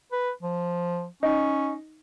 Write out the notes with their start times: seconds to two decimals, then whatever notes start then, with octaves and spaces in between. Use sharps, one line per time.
0.12 B4
0.43 F3
1.23 C#4 D#4